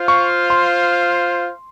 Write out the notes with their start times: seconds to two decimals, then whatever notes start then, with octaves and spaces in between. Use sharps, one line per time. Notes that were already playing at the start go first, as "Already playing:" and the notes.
Already playing: F4 C5 F5
0.08 C#6
0.50 C6